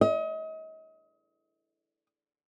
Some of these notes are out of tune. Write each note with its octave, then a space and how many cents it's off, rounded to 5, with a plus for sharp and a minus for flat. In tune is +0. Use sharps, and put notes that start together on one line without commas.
D#5 +35